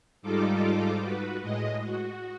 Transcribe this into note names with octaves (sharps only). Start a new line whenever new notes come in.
G#2 G3 D#4 F4 A4 D6
F#4 B4
A2 G#3 D#5
F#4